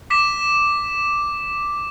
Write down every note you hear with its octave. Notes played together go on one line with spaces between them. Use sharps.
D6 B6 E7